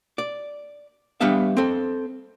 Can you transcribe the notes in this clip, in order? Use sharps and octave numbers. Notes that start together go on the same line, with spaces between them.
D5
G3 B3 D4 E5 F5
C4 A4